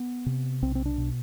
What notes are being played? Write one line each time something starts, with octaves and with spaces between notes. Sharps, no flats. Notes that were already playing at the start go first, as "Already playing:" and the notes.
Already playing: B3
C3
B1 C4
C4
D4
B2